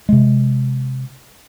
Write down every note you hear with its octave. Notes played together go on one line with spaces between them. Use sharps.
C3 G#3